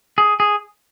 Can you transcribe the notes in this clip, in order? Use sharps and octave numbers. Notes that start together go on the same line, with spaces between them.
G#4
G#4